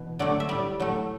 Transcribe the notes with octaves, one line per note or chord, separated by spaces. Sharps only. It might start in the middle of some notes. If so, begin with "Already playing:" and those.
Already playing: B2 E3
D3 F#3 A3 D5
E5
A2 G3 D5
A2 F#3 A3